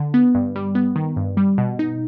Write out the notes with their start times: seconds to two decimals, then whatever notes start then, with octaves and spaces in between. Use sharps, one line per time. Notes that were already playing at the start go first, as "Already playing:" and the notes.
Already playing: D3
0.14 B3
0.35 G2
0.56 G3
0.75 B3
0.96 D#3
1.17 G2
1.37 G3
1.58 B2
1.79 D#4